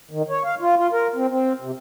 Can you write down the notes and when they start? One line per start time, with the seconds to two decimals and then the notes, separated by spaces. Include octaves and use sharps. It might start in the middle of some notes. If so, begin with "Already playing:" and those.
0.11 D#3
0.29 C#5
0.44 F5
0.61 F4
0.76 F4
0.92 A#4
1.15 C4
1.29 C4
1.61 C3